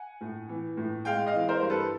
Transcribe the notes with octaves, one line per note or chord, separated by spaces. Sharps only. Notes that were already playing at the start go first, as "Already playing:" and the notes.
Already playing: F#5 G#5
A2
E3
A2
G#3 F5 G5
D#5 F5
E3
A#4 C5
G2
A4 B4